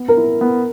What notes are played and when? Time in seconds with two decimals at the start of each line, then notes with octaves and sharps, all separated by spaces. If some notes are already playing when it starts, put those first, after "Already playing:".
Already playing: B3
0.08 A#4
0.17 E4
0.41 B3